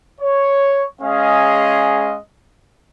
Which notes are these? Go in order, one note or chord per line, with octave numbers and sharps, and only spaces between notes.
C#5
G#3 C#4 G#4 D#5 F5